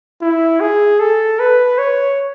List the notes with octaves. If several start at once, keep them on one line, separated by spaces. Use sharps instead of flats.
E4
G#4
A4
B4
C#5